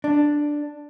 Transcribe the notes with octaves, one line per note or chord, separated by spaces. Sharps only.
D4